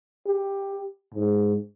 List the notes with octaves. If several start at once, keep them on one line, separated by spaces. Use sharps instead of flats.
G4
G#2